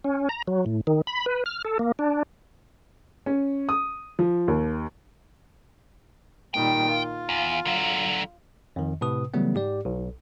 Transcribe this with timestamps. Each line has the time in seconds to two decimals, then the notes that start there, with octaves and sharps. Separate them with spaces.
0.04 C#4
0.29 A#5
0.47 F#3
0.66 A2
0.87 D#3
1.07 B5
1.26 B4
1.46 F6
1.65 A4
1.79 A#3
1.99 D4
3.26 C#4
3.69 D#6
4.19 F3
4.48 D#2
6.54 A#2 D#3 G3 G5
6.88 F4
7.29 E2
7.65 D3 F#3
8.76 F2 D#3
9.01 A2 C3 B4 D#6
9.34 C#3 E3 F#3 G3 A3 B3
9.55 G#2 G4 D5
9.85 B1